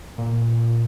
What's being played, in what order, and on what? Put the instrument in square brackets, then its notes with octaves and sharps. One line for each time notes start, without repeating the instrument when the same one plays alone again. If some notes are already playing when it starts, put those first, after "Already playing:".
[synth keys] A#2